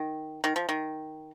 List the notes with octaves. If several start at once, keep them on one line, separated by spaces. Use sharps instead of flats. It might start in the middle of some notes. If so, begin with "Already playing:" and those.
Already playing: D#3
D#3
F3
D#3